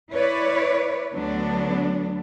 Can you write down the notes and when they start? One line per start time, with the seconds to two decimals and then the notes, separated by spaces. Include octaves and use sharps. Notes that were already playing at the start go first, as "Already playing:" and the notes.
0.12 E4 B4 C#5 D5
1.13 D2 D3 F#3 B3 D4